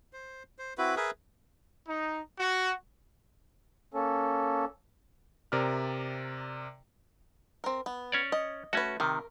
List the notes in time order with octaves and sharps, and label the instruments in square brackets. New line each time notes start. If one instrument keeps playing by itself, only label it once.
[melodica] C5
C5
C4 E4 F#4 B4
G#4 A#4 B4 E5
[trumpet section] D#4
F#4
[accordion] A#3 C#4 A4
[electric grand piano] C3 A#4 D5 F6
[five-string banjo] C4 A#4
B3
[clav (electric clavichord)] C#4 C#5 D5
[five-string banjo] D#5
[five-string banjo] A3 B4 [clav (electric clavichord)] C#4 F#4
[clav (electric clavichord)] C3 D#3 [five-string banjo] A#4